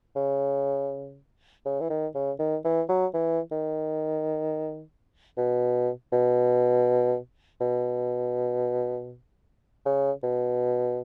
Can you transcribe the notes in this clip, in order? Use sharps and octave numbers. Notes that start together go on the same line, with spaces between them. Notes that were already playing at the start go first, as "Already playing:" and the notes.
C#3
C#3
E3
D#3
C#3
D#3
E3
F#3
E3
D#3
B2
B2
B2
C#3
B2